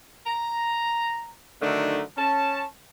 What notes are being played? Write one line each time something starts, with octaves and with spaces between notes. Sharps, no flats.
A#5
D3 D#3 F#3 A3 D4 D#4
C#4 A5